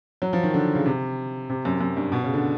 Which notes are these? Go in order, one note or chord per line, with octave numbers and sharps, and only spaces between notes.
F#3
F3
D#3
D3
C#3
C3
C3
F#2
F#2
G2
B2
C#3
D3